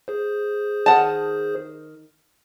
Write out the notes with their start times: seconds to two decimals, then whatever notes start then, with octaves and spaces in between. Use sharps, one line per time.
0.08 G#4 C5
0.86 D#3 F#5 A5